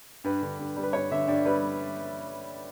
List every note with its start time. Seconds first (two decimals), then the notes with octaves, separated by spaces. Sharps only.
0.24 G2 B4
0.42 D3
0.59 G2
0.77 G3
0.83 B4
0.93 G2 C#5
1.11 D3 E5
1.28 G2 D5
1.45 G3 B4